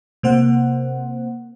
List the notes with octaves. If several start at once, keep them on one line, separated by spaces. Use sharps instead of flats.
C3 A#3 C5 F#5